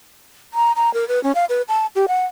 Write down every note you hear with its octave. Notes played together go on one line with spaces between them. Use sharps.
A#5
A#5
A#4
B4
C#4
F5
B4
A5
G4
F#5